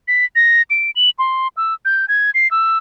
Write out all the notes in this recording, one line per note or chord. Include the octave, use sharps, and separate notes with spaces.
B6
A#6
D7
F#7
C6
E6
G6
G#6
C7
E6